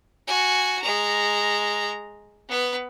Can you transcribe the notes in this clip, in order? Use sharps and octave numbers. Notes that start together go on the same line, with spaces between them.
F#4 G#5
G#3 A#5
B3 B4